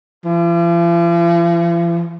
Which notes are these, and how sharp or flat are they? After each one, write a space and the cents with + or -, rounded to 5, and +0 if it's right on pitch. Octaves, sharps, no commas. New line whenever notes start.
F3 -45